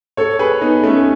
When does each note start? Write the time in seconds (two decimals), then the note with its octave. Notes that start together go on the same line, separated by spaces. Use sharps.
0.17 A4 C#5
0.39 G#4 B4
0.61 B3 D#4
0.83 A3 C#4